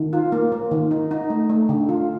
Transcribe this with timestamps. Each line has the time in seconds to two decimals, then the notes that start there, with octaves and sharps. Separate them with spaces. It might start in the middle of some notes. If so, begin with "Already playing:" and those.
Already playing: D#3
0.13 F4
0.32 A#3
0.52 A#3
0.71 D#3
0.91 D#4
1.11 D#4
1.30 A3
1.49 A3
1.69 D3
1.89 F4